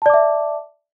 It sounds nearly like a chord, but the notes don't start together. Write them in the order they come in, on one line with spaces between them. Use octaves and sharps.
A5 D5 D6 E5